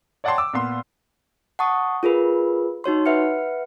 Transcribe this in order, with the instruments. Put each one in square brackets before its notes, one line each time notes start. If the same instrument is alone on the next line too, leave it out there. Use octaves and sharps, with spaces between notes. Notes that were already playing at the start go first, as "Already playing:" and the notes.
[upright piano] C#5 D5 F#5 G5 A5 C6
D6 E6
A#2 B3 C6
[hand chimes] F#5 A5 C#6 D#6
F4 G#4 A#4 B4
D#4 F#4 C#5 C6
B4 E5 F#5 F6 C#7